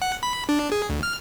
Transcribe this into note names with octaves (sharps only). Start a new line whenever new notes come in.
F#5
B5
D4
G#4
D2
F6